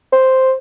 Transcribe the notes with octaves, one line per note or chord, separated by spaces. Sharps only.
C5